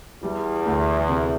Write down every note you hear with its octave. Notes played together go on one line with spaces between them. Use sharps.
E2 G3
D2
C3